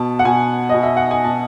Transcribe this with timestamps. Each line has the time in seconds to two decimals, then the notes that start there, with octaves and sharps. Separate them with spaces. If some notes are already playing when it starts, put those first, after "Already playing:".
Already playing: B2 A5
0.19 F#5
0.25 B2 G#5
0.69 B2 D#5
0.83 E5
0.97 F#5
1.11 G#5
1.24 B2 A5